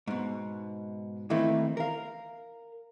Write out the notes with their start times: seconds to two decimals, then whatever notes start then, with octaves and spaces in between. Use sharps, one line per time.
0.07 G#2 B2
1.30 D#3 E3 A3 A#3 C4 E4
1.77 A#4 F5